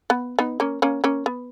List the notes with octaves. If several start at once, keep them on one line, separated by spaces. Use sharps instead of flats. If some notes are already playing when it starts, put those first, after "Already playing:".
B3
B3 D#4
A#3 C#4
A#3 C#4
A#3 C#4
B3